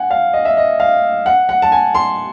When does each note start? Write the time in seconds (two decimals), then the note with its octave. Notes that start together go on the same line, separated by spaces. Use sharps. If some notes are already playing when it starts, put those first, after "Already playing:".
Already playing: F#5 G#5
0.11 F5
0.33 D#5
0.45 E5
0.57 D#5
0.80 F5
1.26 F#5
1.49 F#5
1.62 A5
1.72 G#5
1.95 C6